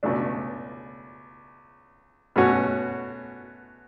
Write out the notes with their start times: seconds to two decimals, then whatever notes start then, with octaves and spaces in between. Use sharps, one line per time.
0.03 C#2 B2 A3 D4
2.36 B2 A3 C#4 F#4